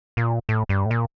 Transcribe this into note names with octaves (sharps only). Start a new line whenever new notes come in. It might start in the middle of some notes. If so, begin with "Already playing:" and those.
A#2
A2
G2
A2
A#2